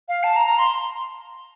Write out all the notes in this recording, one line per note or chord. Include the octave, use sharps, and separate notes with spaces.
F5
A5
A#5
A#5
C6